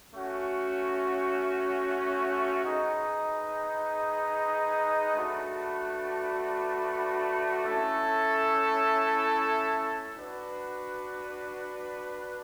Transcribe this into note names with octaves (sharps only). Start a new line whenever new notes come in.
A3 C#4 F#4
D#4 G#4 B4 D#5
A3 D4 F#4 B4
A3 C#4 E4 A4
D4 F#4 B4